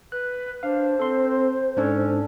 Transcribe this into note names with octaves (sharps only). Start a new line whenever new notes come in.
B4 F#6
D4 C5 F5
C4 A4 C6
G#2 C#4 D4 A4